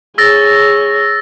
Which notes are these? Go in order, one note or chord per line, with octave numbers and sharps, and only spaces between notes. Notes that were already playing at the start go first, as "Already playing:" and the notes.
G#4 C#5 E6 A6 A#6